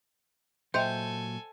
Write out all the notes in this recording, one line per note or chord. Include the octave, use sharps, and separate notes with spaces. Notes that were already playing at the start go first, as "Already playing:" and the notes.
A#2 F#3 A4 C5 D#5 E5 G5 G#5